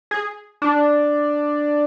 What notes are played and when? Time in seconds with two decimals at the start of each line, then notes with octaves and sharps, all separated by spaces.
0.11 G#4
0.62 D4